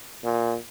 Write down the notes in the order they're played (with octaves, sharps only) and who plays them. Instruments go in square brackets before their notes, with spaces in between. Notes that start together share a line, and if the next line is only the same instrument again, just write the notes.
[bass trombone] A#2